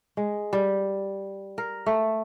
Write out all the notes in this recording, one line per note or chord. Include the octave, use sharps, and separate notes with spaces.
G#3
G3
A#4
A3